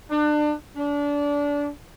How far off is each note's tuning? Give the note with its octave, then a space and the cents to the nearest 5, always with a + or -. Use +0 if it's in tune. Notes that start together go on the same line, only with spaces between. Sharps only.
D4 +30
D4 -25